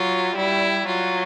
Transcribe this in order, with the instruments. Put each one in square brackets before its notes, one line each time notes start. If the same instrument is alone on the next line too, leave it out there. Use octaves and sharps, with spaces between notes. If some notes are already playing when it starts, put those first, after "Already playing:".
Already playing: [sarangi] F#3 [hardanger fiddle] F4
[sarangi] G3 [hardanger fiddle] E4
[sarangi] F#3 [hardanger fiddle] F4